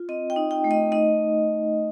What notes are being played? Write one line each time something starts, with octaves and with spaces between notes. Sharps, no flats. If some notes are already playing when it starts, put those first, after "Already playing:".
Already playing: F4
C4 D#5
G5
D#4
G5
A3
D#5
D#4 D#5